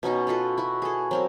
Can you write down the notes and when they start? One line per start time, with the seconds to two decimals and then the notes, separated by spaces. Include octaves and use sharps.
0.03 B2 C#4 D#4 F#4
0.27 F4 F#4 A4 B4
0.58 E4 F#4
0.82 G#4 A4
1.11 F#3 C4 A#4